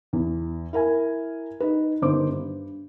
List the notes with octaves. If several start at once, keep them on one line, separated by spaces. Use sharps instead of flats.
E2
E4 A#4 G#5
D#4 B4
G1 D#3 C5 D6
G2